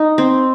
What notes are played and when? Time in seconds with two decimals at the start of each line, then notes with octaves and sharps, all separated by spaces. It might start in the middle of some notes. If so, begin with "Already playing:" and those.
Already playing: D#4
0.18 C4